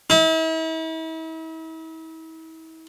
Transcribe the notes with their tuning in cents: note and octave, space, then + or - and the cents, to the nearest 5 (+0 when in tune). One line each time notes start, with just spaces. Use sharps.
E4 -40